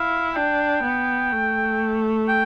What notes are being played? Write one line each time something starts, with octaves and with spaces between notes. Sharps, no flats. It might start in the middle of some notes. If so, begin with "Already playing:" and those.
Already playing: E4 F5
D4 G5
B3
A3
G5